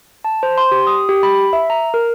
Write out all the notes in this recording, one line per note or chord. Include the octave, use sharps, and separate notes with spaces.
A5
C5
C6
G4
D#6
G4
B5
E5
A#5
A#4